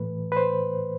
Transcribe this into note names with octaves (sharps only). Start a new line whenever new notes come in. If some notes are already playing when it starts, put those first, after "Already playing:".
Already playing: A2 E3 A3 B4
B4
C5